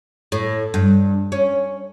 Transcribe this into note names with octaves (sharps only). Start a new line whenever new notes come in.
A2
G2
C#4